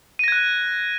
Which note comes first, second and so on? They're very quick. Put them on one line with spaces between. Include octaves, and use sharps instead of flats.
D#7 A#6 G#6 F#6